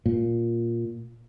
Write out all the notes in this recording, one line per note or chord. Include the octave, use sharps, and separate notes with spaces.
A#2